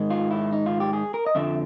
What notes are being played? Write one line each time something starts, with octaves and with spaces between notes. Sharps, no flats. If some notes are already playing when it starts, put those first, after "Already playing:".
Already playing: G#2 D#3 G#3
F4
E4
D#4
F4
G4
G#4
A#4
D#5
F2 D3 F3 E5